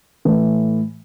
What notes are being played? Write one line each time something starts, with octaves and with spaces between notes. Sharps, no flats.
A2 E3 A3